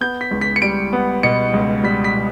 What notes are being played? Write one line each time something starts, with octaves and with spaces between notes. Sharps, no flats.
B3 G6
B6
C#2
B6
C#7
G3 D7
B3
B2 C#7
C#2
G3 B6
B6
B2